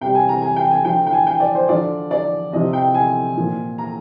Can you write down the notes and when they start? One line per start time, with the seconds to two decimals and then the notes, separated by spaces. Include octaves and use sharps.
0.01 C3 G3 G5
0.15 G#5
0.29 A#5
0.42 G#5
0.56 G5
0.71 G#5
0.85 D3 F3 G5
1.07 G5
1.13 G#5
1.27 G5
1.40 D5
1.55 C5
1.69 D3 F3 D5
2.11 D5
2.53 C3 F3 D#5
2.73 G5
2.94 G#5
3.37 A#2 F3
3.78 A#5